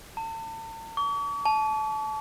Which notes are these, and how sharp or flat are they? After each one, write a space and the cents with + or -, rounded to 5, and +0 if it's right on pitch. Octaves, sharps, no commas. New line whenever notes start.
A5 +40
C#6 +45
A5 -25